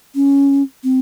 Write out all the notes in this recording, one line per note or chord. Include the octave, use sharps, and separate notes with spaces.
C#4
C4